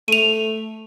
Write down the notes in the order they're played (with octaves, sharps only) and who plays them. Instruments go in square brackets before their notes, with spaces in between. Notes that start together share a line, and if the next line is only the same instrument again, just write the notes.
[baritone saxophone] A3 [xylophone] D#7 F7